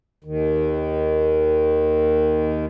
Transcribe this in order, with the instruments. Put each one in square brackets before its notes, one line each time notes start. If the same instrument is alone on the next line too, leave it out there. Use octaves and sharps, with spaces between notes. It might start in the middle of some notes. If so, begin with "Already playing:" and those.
[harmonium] D#2 D#3